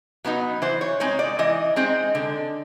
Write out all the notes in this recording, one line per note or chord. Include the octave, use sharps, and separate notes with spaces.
F#3 B3 D#4
E3 C5
C#5
G#3 C4 D#4 C#5
D5
E3 D#5
G#3 C4 D#4
D3